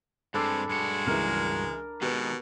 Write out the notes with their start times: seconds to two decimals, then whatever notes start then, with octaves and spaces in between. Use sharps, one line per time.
0.34 G2 G#3 C4 D4 A4 B5
0.70 G2 G#3 F#4
1.06 C#2 E3 A#4
2.02 B2 D#3 G#3 G4 B4